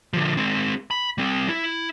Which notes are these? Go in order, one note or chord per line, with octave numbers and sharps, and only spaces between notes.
D3 F3
G#3 C4
B5
G3 C4
E4